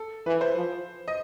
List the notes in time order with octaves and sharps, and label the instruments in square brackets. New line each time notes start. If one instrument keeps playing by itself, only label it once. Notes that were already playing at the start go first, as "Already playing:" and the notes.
Already playing: [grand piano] A4
[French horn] E3 [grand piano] B4
[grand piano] C5
[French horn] F3
[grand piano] D#5